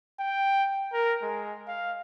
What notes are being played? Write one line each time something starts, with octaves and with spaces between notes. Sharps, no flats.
G5
A#4
G#3
F5